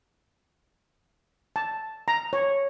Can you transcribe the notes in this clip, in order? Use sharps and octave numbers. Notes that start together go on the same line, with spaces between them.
A5
A#5
C#5